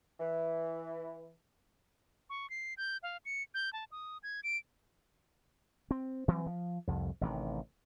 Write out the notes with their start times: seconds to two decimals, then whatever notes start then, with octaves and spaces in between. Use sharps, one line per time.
0.20 E3
2.30 C#6
2.50 C7
2.78 G6
3.03 F5
3.25 C#7
3.54 G6
3.73 A5
3.92 D#6
4.23 G#6
4.44 D7
5.91 C4
6.28 E3 F#3 C4
6.46 F3
6.87 C2 F2
7.21 A1 C3 D#3